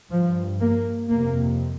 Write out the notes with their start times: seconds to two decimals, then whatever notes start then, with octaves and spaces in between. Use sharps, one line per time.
0.10 G2 F3
0.60 A#3
1.10 F2 C3 A#3